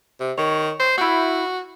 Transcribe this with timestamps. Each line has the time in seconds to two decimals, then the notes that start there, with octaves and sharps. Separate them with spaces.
0.20 C3
0.38 D#3 C#5
0.79 C5
0.98 E4 F#4 G6